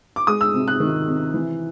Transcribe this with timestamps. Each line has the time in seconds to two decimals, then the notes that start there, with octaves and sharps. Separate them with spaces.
0.16 D6
0.27 G#3 D#6
0.41 E6
0.54 C3
0.68 F#6
0.80 D#3
1.08 C3
1.34 E3